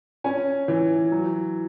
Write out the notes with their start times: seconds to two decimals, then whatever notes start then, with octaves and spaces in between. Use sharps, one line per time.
0.24 C#4 G#5
0.68 E3
1.12 F#3